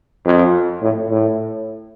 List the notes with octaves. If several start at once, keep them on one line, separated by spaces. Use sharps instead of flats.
F2
A2
A2